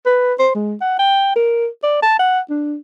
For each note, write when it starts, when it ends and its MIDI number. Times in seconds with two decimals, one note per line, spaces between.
0.06 0.34 71
0.39 0.50 72
0.55 0.74 56
0.81 0.97 78
0.99 1.34 79
1.36 1.67 70
1.83 2.01 74
2.02 2.16 81
2.19 2.40 78
2.50 2.76 62